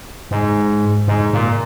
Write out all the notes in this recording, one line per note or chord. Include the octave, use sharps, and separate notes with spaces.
G#2
G#2
A#2